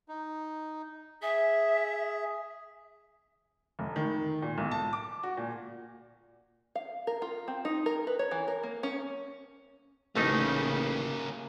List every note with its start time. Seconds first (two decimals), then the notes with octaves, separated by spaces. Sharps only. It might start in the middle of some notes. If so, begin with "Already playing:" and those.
0.08 D#4
1.22 G#4 E5
3.79 F1
3.96 D#3
4.42 A#2
4.58 B1
4.71 A5
4.93 D6
5.23 F#4
5.37 A#2
6.75 F5
7.07 A#4
7.22 F4
7.48 C4
7.65 D#4
7.86 A#4
8.07 B4
8.19 C#5
8.31 E3
8.48 A#4
8.63 A#3
8.83 C#4
10.15 A1 C#3 A3 A#3 C#4 D#4